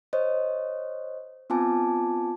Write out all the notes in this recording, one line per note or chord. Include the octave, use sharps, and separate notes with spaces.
C5 C#5 D#5
B3 C4 F4 G#5 A5 D6